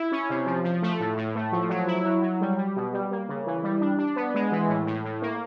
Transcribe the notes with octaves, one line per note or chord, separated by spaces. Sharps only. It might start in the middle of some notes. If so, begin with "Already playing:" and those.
Already playing: E4
C#4
C3
F3
F3
A3
A2
A2
A3
F3
F#3
E4
F#3
F#3
G3
G3
B2
G3
A#3
C#3
E3
G3
D4
D4
B3
G#3
E3
A2
A2
A2
A#3